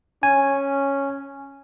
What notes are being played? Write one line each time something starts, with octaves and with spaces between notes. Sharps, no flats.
C#4 G#5